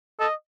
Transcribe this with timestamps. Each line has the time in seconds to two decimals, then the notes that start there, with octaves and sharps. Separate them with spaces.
0.20 A4 D#5